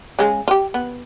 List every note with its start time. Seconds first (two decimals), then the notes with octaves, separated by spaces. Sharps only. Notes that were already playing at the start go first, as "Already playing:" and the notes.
0.19 C#3 G#3
0.48 F4 G4
0.74 B3